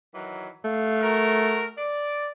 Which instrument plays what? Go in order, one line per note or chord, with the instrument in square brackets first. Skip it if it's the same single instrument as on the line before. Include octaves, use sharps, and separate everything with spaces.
[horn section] D#3 E3 F#3
[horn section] G2 F5 [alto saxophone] A3
[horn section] F#4 A#4
D5